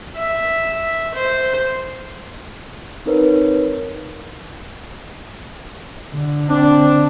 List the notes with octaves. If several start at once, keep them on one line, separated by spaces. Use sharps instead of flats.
E5
C5
C4 D#4 A#4 B4 C#5
D3
C4 D4